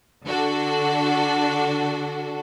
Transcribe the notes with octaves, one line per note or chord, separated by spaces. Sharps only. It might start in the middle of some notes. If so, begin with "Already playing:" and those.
D3 D4 F#4 A4